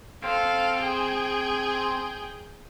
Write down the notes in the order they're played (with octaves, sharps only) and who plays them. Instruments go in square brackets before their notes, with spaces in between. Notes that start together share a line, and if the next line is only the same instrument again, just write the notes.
[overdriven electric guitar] C4 [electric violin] A4 F5
[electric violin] G#4 G5